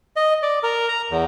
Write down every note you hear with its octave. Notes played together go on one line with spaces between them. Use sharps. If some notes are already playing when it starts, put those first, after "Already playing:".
D#5
D5
A#4
A#5
E2